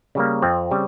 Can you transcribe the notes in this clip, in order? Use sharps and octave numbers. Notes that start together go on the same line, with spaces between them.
C#3 G3 A#3
F2 C4
C#3 G3